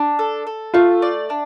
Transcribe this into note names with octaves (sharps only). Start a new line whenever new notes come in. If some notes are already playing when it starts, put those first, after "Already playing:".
Already playing: D4
A4
A4
A3 F4
D5
D4